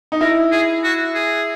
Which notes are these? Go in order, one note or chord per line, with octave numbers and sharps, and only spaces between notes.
D#4
E4 A#4
G#4
F#4
G#4